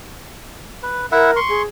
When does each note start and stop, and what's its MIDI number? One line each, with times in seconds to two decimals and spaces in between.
0.83 1.06 71
1.12 1.31 64
1.12 1.40 70
1.12 1.31 76
1.12 1.31 78
1.36 1.62 84
1.36 1.62 85
1.49 1.66 68